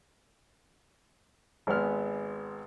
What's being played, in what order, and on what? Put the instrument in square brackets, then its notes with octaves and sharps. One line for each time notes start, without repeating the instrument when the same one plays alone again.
[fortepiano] G#1 G#3 B3 F6